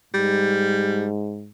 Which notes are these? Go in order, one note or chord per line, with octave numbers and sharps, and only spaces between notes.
G#2 G3